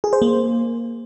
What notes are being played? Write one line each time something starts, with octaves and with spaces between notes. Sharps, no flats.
G#4
C5
A#3